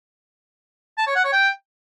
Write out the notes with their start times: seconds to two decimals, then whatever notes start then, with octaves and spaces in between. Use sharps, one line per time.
0.98 A5
1.07 C#5
1.15 F#5
1.24 C#5
1.33 G5